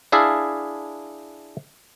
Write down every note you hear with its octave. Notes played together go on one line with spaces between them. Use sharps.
D4 E4 G#4 E5 F5 A5